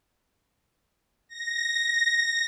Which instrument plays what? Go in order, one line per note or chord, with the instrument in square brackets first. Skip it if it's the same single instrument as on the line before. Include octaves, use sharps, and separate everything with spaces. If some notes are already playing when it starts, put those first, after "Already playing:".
[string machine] A#6